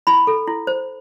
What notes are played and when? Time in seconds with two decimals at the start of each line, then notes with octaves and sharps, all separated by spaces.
0.07 E4 B5
0.27 A4
0.47 E4
0.67 C5